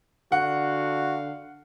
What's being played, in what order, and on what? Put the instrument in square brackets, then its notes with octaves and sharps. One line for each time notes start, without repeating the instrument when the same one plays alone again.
[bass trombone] D3 [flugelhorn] F#4 [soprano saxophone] F5 [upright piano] F#5